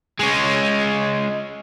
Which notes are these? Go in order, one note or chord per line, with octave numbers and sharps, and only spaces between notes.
G#3 C#4